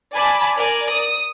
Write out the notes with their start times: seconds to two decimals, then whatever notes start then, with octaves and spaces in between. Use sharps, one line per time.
0.15 D5 G#5 A5 B5
0.57 A#4 D5 G#5
0.92 D#6